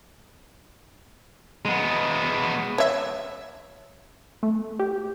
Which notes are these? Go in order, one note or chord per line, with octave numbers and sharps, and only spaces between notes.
G#3 B3
C#5 E5
A3
G4